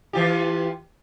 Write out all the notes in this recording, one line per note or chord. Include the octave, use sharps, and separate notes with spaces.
E3 F4 G4